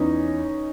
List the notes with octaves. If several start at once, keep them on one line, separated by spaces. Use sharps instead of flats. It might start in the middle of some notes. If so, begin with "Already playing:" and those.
Already playing: E2 C#4 D#4